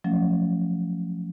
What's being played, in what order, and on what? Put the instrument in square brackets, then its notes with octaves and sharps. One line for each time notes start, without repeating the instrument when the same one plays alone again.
[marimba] F3 F#3 A3 C#4